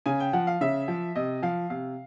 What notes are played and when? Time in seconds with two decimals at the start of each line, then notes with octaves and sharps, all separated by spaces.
0.06 C#3 G#5
0.20 G5
0.33 F3 F#5
0.47 F5
0.61 C#3 E5
0.88 F3
1.15 C3 D#5
1.42 F3 F5
1.70 C3 F5